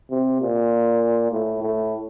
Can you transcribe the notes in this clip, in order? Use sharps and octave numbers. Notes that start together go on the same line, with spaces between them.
C3
A#2
A2
A2